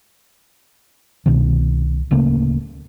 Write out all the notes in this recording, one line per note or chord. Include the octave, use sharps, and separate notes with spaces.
C2 B2 D#3
D1 C#3 A3 A#3